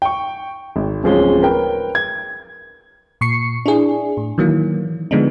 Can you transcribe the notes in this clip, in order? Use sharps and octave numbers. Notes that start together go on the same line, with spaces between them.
G5 C#6
G#1
D1 F3 G#3 C#4
A#4 B4 G5
G#6
A#2 C#6 C7 C#7
D4 E4 G#4
A2
D#3 E3 F#3 A#3
D3 F3 G#3 B3 D4 D#4